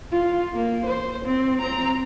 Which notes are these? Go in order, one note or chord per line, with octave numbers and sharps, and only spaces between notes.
F4
A#3
C5
C4
C4 A#5